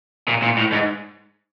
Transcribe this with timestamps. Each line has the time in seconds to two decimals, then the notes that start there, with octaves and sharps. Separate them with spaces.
0.28 A#2
0.42 A#2
0.57 A2
0.72 G#2